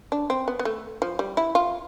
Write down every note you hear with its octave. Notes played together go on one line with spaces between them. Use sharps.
D4
C4
B3
B3
A3
F3
G3
E4
F4